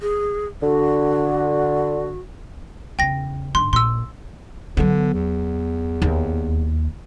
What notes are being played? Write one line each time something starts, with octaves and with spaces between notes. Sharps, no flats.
G#4
D3 F#4
E2 C#3 G5 A#6
G#2 D3 C6
A#1 A#2 C6 E6
D3 F#3 B3
E2
D#2